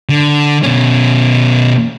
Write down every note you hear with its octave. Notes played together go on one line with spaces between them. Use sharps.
D3
B2 C#4